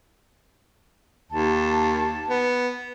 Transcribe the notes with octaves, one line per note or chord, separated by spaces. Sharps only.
D#2 A5
B3